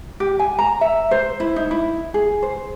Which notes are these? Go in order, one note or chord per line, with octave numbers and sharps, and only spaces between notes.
G4
G#5
A#5
E5
C5
E4
D#4
E4
G#4
C5